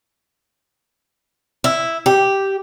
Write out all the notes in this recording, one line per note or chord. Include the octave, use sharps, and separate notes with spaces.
E4
G4